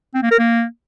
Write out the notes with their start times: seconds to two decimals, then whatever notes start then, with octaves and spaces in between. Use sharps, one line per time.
0.15 C4
0.23 A#3
0.31 A#4
0.39 A#3